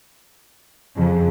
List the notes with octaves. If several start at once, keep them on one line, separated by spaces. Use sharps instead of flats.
F2 C#3 F3